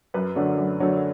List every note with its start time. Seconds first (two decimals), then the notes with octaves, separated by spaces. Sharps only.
0.14 F#2 B4
0.36 D3 F#3 A3 D4
0.57 F#2
0.80 D3 F#3 A3 D4